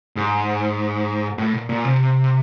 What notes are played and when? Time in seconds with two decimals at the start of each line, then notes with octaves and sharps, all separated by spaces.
0.16 G#2
1.38 A2
1.54 A#2
1.69 A#2
1.85 C3